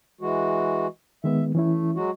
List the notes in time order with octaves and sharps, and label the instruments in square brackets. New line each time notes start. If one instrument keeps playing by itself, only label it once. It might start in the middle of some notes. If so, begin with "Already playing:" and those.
[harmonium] E3 G#3 F#4
[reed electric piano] D#3 G#3 B3 [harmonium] E5
[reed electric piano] E3 C#4 E4 [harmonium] A3
[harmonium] F#3 G#3 F#4